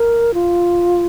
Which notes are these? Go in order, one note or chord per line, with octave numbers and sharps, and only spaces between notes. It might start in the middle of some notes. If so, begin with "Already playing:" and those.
Already playing: A#4
F4